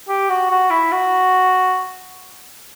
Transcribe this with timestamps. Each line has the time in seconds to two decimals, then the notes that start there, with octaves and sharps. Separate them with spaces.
0.09 G4
0.29 F#4
0.50 F#4
0.70 E4
0.92 F#4